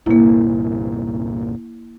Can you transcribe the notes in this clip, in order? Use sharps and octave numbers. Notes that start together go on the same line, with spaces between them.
G1 C2 A#2 A#3 E4